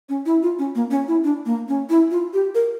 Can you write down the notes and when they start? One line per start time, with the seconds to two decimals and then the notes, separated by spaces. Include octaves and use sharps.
0.09 C#4
0.26 E4
0.43 F4
0.59 C#4
0.75 A#3
0.91 C#4
1.08 E4
1.24 D4
1.46 A#3
1.68 C#4
1.89 E4
2.11 F4
2.33 G4
2.55 A#4